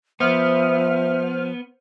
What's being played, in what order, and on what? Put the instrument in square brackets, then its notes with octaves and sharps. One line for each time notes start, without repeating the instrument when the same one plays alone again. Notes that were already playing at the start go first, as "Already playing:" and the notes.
[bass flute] F3 [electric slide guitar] B3 [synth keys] C5 F6 [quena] E5